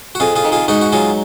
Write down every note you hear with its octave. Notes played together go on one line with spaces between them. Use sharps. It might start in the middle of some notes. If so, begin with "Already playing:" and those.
F#4
F2 F4 G#4
F4 G#4
D#3
F4 G#4
G#2 D#4 F#4
F#4
F#3 F4 G#4